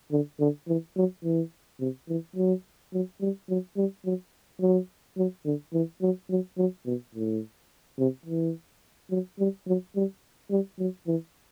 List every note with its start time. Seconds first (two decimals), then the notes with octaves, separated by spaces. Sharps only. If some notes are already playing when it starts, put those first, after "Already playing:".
0.11 D3
0.40 D3
0.68 E3
0.96 F#3
1.24 E3
1.80 C3
2.08 E3
2.36 F#3
2.93 F#3
3.21 G3
3.49 F#3
3.77 G3
4.05 F#3
4.61 F#3
5.17 F#3
5.45 D3
5.73 E3
6.02 F#3
6.30 F#3
6.58 F#3
6.86 B2
7.15 A2
7.99 C3
8.26 E3
9.11 F#3
9.39 G3
9.67 F#3
9.96 G3
10.51 G3
10.79 F#3
11.07 E3